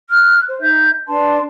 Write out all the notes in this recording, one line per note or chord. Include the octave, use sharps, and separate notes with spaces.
F6 F#6
C5
D#4 E5 G6
D4 B4 A5 C6